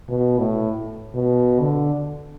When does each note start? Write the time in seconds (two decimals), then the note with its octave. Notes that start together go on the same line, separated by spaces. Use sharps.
0.09 B2
0.38 A2
1.15 B2
1.60 D3